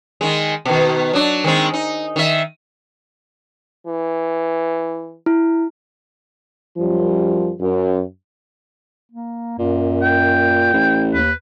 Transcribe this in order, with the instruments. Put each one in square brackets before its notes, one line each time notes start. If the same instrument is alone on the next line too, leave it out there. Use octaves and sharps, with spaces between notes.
[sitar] D#3 G#3
B2 D#3
F#3 D4
D#3 G#3 C4
D#4
D#3 E5
[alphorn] E3
[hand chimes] E4
[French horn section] F#2 F3 G3
F#2
[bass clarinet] A#3
[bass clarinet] F#2 [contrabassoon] A#2
[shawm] G5
[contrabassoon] A1
[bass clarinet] D#2 [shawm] B4